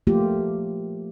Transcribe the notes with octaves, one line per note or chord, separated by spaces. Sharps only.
F3 A3 A#3 F4 G4